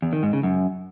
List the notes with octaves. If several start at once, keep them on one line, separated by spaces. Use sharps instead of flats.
E2
D#3
G#2
C#3
F#2